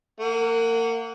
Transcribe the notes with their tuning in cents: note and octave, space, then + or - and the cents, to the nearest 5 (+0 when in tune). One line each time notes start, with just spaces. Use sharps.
A#3 -30 F#5 +0